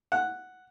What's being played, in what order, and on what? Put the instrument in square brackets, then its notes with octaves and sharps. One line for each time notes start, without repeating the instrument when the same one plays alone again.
[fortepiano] F#5